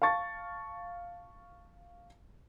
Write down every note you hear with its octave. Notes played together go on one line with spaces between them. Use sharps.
F5 A5 C#6 A6